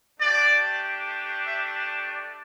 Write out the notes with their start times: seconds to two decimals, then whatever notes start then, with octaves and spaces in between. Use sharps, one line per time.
0.19 A3 D4 G4 D5
1.46 E5
1.76 D5
2.08 D5